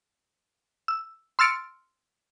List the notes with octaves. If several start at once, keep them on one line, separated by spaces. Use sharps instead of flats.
E6
C6 E6 F6 A6 C#7 D7